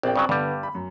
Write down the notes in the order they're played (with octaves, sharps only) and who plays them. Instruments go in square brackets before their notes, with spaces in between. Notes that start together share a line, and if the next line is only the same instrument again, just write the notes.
[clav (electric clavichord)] A#1 [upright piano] C4 D5 G5
[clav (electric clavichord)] G2 C#3 F#3
[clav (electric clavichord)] G2 G3 [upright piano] D3 B3
[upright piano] B5
F#2